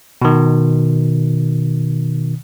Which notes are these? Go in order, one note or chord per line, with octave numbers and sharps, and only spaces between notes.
B2 D#3